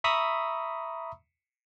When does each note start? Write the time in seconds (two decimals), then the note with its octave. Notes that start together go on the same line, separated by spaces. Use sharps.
0.04 E5 A#5 B5 C#6 D#6 E6